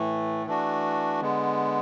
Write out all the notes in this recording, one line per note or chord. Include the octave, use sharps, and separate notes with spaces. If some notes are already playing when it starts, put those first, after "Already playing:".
Already playing: A2 E3 A3
E3 A3 D4 F#4
D3 G#3 B3